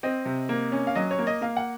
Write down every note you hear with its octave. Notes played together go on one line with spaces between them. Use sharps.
C4 D#5
C3
A#3
C#4
F5
F#3 D#5
C#5
A#3
D#5
A#3 F5
F#5